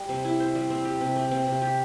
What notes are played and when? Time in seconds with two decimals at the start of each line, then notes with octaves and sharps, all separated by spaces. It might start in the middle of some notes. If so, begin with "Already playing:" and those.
Already playing: G3
0.09 C3
0.25 E4
0.40 C5
0.55 G3
0.70 C4
0.85 G4
1.01 C3
1.16 A3
1.31 C4
1.47 C3
1.62 G4